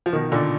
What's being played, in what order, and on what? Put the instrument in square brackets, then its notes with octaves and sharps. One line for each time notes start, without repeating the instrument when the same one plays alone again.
[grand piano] F3
B2 D#3
A#2 D3